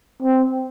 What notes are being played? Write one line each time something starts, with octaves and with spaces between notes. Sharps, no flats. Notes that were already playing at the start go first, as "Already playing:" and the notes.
C4